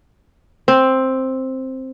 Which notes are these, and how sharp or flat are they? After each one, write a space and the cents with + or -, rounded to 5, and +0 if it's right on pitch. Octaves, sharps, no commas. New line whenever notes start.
C4 +5